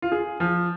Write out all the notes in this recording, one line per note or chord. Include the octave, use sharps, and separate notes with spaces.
F4
G#4
F3